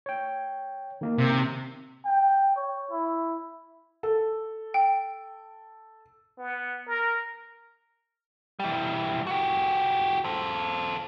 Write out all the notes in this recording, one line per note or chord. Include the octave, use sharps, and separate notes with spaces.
C#5 G5
D#3 A#3 D#4
C3
G5
C#5
E4
A4
G5
B3
A#4
E3 G3
F#4 G4
A4 C5